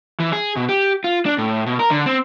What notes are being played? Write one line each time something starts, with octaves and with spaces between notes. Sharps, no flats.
E3
G#4
B2
G4
F4
D4
A2
B2
A#4
D3
C4